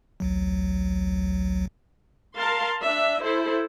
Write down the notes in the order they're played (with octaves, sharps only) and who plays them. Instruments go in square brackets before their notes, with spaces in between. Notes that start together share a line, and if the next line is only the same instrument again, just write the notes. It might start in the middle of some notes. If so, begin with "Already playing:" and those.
[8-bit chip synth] A1 D2 F#3
[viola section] A#4 F5 A5 C6
D4 E5
E4 A4 C5